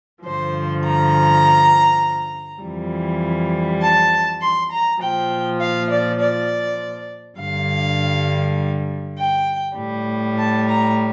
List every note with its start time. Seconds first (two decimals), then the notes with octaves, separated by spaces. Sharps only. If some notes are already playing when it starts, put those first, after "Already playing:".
0.24 G2 D3 F3 C5
0.84 A#5
2.62 F2 E3 G3
3.81 A5
4.41 C6
4.71 A#5
5.01 A#2 F3 G5
5.60 F5
5.90 D5
6.20 D5
7.39 G2 D3 G3 F5
9.18 G5
9.77 A2 G3
10.38 A5
10.67 A#5